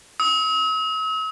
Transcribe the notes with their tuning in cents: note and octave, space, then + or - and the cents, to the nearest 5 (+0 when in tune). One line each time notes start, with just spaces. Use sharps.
E6 -45